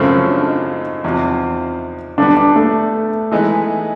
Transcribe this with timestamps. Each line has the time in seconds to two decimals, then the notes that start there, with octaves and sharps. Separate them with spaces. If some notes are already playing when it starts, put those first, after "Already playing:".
Already playing: F#2 C#3 F3 A3 C4
0.09 C#4
0.28 D4
0.47 D#4
1.04 E2 C3 F3
2.18 D3 G3 B3 D4
2.37 D4
2.56 A3
3.32 E3 G#3 B3 D#4